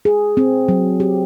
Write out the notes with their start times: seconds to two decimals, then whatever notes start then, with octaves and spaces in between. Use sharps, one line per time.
0.05 G#4
0.37 C4
0.68 F#3
1.00 G4